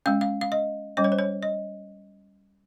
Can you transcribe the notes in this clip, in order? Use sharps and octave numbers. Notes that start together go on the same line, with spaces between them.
G#3 C#4 F5
F5
F5
D#5
G3 C#4 D#5
C#5
C5
C#5
D#5